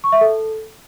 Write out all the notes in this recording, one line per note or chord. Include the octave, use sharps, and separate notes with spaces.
C#6
E5
A4